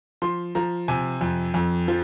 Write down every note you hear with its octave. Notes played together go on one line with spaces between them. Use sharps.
F3 C6
F3 A#5
C3 G#5
F2
F2
F3